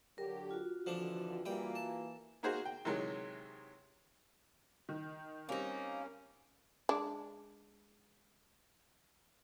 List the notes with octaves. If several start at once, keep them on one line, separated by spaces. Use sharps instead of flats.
D3 F#3 G4 A#4
F4 F#4
F2 D3 E3 F3 D4
E3 G3 A#3 G5
A5
A#3 D#4 F#4 G#4 C5
G5
C3 D#3 E3 F#3 G#3
D#3
G3 A#3 C4 C#4 D#4
G#3 D4